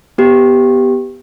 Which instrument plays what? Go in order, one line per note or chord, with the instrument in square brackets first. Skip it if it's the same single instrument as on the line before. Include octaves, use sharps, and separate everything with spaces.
[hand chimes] B3 G4